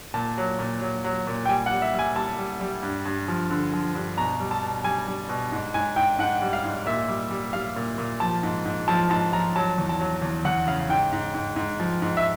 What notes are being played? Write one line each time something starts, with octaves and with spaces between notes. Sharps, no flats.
A#2 A5
F#3
A#2
F#3
F#3
A#2
G5
G3 G#5
F#5
G3
E5
G3 G#5
G3 A5
G3
G3
G2
G2
F3
D3
F3
G2
B2 A#5
G3
A5
B2
G3 G#5
G3
B2
G#2
G#2 G#5
G#2 G5
G#2 F#5
G3
F5
G#2
A#2 E5
G3
G3
G3 F5
A#2
A#2
F3 A5
G#2
G#2
F3 A5
G#2 A5
F3 A#5
F#3 A5
E2
A5
F#3
E2
E2 F#5
C#3 F5
G#2 G5
G#2
G#2
G#2
F3
G#2
E5